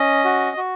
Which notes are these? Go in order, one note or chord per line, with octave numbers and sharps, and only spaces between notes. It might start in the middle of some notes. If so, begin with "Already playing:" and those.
Already playing: C#4 D#5
F#4
F#4